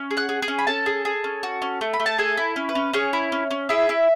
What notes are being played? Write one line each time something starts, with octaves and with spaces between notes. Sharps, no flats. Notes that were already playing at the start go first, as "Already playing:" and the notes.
Already playing: C#4
G#4
F#5 F#6
G#4
G#4 G#5
C#4
B5
C#4 A4 A5
G#4
G#4
C#4
F#4
C#4
A3
B5
A3
A5
G#4 A4 G#5
E4
C#4
B4
C#4
C#4 G#4 C#5
E4
C#4
C#4
E4 G#4 E5
E4